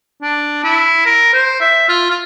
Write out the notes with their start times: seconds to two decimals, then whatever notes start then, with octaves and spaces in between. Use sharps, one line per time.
0.23 D4
0.64 E4
1.06 A#4
1.34 C5
1.61 E5
1.89 F4
2.10 F4